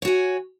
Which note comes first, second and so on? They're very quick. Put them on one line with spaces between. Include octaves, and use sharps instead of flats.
C#5 F#4 G#5